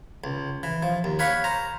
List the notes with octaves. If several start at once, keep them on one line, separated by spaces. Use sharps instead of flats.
C#2
E3
F3
D#2
C#5 F5 F#5 B5 C#6
C5 A#5